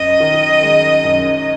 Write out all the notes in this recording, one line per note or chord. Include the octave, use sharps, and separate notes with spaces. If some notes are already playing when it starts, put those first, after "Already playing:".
Already playing: F#2 D#5
D#3
G#3
F#2